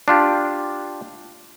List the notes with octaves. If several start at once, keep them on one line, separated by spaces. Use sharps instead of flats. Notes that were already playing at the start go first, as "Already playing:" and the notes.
D4 F4 G4